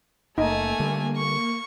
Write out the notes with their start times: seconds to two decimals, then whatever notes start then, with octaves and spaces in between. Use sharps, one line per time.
0.38 F#1 A3 A#3 D#4 G#5
0.80 D3 G3
1.17 C#6